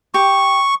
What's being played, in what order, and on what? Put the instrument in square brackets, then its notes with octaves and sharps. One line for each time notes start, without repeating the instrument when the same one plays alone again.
[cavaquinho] G4 [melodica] C#6